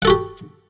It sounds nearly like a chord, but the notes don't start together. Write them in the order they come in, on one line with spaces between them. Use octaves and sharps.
F#5 A4 F#4 G4